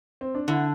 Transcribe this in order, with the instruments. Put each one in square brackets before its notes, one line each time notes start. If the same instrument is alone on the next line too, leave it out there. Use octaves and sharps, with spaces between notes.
[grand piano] C4
D4
[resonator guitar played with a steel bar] D3 [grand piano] E4